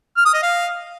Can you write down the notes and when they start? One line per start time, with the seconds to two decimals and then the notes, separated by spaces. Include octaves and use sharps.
0.17 F6
0.25 D#6
0.34 D#5
0.42 F5